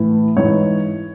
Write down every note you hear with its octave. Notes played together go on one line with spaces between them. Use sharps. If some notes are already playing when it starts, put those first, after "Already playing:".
Already playing: A2 E3
G#2 E3 C#5